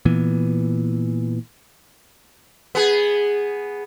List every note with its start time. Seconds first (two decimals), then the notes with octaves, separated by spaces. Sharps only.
0.05 A#2 E3 B3
2.75 B3 G#4